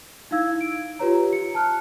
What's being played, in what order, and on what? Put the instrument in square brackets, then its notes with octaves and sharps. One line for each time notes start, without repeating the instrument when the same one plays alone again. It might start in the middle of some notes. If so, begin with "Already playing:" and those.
[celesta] D#4 E4 F5 E6 G#6
D7
F4 G4 B4 C#5 A#5
C#7
A5 F6 F#6